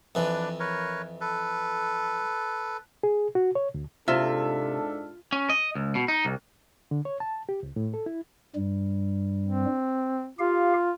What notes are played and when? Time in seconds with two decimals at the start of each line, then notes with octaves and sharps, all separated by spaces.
0.15 F2 E3 D4 B4 D5
0.60 A#4 B4 C#5
1.21 A4 B4
3.03 G#4
3.35 F#4
3.55 C#5
3.74 D2
4.08 G#2 C3 D4 F4 A4 E5
5.32 C#4
5.50 D#5
5.75 C#2
5.95 B2
6.08 D#4
6.25 C2
6.91 D3
7.05 C#5
7.20 A5
7.49 G4
7.63 C#2
7.76 A2
7.94 A4
8.06 E4
8.56 G2 G3
9.45 C4
10.39 F4 G4 F5